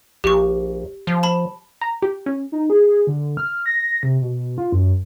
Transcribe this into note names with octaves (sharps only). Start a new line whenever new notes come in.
A#1 G4 C#6
F3
A5 B5
A#5
G4
C#4
D#4
G#4
G#4
D3
F6
A#6
C3
B2
F4
F#2